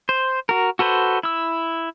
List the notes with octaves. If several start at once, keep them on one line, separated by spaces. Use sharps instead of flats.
C5
F#4 A#4
F#4 A4 B4 C5
E4 E6